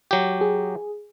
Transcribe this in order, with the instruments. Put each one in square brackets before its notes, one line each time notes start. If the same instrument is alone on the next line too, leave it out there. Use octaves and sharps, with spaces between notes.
[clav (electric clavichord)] F#3 G4
[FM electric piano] G#4